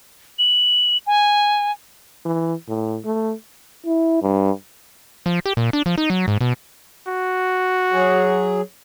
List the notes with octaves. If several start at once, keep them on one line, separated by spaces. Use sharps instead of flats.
F#7
G#5
E3
A2
A3
E4
G2
F3
G4
A#2
D4
F3
D#4
F#3
G#2
B2
F#4
F#3 G#4